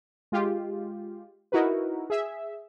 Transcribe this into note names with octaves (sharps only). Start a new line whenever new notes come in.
G#3 F4 G4
D#4 E4 F#4 A#4 B4
G#4 E5